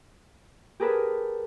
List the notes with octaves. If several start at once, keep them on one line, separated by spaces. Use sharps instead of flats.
G4 G#4 A#4 B4 A5